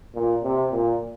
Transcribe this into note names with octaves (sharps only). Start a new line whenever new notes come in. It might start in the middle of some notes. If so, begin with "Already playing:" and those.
A#2
C3
A#2